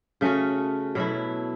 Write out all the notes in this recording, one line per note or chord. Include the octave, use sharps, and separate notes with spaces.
C#3 A3 C#4 F#4
B2 F#3 A3 E4